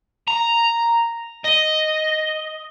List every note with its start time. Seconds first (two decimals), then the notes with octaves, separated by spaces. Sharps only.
0.28 A#5
1.45 D#5